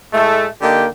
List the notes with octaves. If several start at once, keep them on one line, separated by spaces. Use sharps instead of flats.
A2 G#3 A3
D3 A#3 D#4 G4 G5